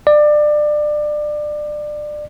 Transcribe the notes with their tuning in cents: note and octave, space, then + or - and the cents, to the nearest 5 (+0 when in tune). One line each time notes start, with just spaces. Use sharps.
D5 +25